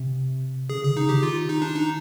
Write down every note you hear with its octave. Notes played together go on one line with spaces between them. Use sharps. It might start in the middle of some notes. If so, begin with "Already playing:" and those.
Already playing: C3
C#3 G#4
D3 G#4
C#3 D#4
D#3 G4
F4
D#4
D4
D#4